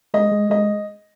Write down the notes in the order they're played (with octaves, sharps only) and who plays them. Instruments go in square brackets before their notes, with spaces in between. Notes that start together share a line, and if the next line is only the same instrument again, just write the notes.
[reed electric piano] G#3 [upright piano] D#5
[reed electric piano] G#3
[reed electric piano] G#3 [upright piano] D#5